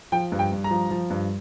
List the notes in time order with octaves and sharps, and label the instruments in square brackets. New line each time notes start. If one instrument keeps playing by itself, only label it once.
[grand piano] F3 G5
G2
G5
G2
A#5
F3
F3
G2